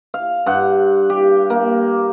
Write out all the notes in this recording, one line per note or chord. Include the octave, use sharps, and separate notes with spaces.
F5
G2 F#5
G4
A#3